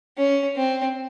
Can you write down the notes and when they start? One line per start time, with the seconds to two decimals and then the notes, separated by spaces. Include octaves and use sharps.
0.17 C#4
0.56 C4